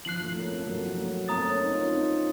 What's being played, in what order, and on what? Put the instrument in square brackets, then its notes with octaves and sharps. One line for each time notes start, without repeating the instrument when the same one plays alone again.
[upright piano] F3 [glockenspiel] F#6 C7 F#7
[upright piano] F3 A3
A#3 C#4
A3 C4
F#3 A#3
F3 A3
F#3 A#3
[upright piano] A3 C4 [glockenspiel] A#5 D#6 A6
[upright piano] A#3 C#4
C4 D#4
C#4 F4
C4 D#4